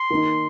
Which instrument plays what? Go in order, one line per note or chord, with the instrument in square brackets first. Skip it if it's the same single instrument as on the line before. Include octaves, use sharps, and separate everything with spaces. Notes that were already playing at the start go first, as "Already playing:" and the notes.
Already playing: [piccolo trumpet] C6
[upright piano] D#3 A#3 D#4